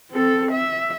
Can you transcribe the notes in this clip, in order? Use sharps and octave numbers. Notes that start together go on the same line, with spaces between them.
C4 A4
E5